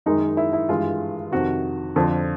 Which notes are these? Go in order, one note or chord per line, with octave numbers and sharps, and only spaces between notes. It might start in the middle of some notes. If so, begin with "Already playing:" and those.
F#2 D#3 G#3 D#4
E4
E4
G2 E3 G#3 F4
F2 C3 D#3 F#4
F2 D3 F3